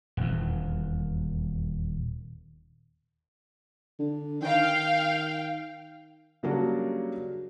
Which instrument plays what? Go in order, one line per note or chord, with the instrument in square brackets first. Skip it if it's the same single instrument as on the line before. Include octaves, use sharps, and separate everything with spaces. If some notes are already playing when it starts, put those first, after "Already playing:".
[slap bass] D#1 E2
[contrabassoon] D3
[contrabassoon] D#3 [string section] F5 G5
[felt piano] C#3 F#3 G3 A#3 D4 F#4